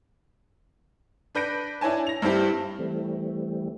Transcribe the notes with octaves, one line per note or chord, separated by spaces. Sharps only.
D4 B4 G6 A#6 D7
D4 E4 C#5 G#5 A5
A#6 F7
G2 C4 E4 G4
E3 G3 A3 C4